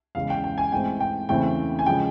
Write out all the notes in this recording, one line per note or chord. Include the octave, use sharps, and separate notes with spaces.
E2 C#3 E3 G#3 F5
G5
G5
G#5
G#2 E3 A3 C4 G5
G5
E2 C#3 E3 A3 C4 G5
G#5
C#3 F3 G#3 G5